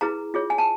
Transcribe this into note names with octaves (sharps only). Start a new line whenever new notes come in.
E4 G#4 B4 A#5
F4 G#4 C#5
G#5
A5